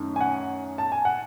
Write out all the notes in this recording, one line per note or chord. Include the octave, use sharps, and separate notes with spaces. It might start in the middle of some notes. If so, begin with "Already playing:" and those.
Already playing: F#2 D#3 A3
G#5
F#5
A5
G#5
F#5